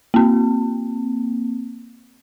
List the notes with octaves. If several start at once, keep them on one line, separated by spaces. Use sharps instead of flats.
A#3 C4